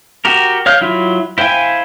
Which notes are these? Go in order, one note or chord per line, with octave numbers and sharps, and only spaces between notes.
F#4 G4 A#4
C#5 F5 F6 G6
F#3 E4 F4 E5
E4 C5 F5 G5 G#5